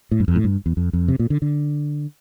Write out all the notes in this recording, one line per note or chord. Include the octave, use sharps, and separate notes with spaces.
A2
G2
F2
A2
G2
E2
F2
F2
C3
A#2
D3
D3